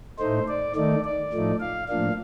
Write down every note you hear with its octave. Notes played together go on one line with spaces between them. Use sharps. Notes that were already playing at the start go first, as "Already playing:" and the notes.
A2 A3 D#4 C5
D5
D#3 A3 D#4 D5
D5
A2 F3 A3 D#4
F5
A2 F3 A#3 D4 F5